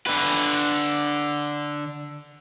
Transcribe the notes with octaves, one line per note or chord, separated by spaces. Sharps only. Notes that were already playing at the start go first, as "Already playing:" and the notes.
D3 B4